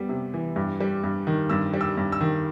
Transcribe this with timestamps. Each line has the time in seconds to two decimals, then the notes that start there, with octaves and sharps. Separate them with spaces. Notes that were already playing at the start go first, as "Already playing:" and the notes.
Already playing: G3 B3
0.09 C3
0.34 E3
0.56 G2
0.80 G3
1.04 G2
1.27 D#3
1.49 G2 E6
1.73 G3
1.81 E6
1.97 G2
2.12 E6
2.21 D#3